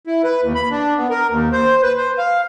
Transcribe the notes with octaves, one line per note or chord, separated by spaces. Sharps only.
E4
B4
D#2
B5
D4
B3
A#4
D#2
C5
B4
C5
F5